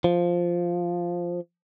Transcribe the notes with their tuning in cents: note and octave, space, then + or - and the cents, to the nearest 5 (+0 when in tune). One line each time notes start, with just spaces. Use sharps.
F3 +0